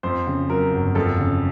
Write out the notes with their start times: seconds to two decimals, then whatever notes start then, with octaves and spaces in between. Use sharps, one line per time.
0.03 F2 C5
0.27 C#3
0.49 F#3 A#4
0.72 G1
0.95 F2 A4
1.19 C#3